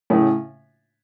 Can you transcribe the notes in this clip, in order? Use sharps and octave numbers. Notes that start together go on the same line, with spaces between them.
A2 C#3